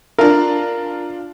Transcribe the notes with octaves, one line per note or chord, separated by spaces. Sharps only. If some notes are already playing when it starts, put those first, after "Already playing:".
D4 F4 A#4